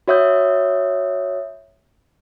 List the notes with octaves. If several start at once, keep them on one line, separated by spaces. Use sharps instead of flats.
F#4 C#5 E5 D#6 G6